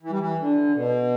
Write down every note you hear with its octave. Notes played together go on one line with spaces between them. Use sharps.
E3
G3
E3
D3
B2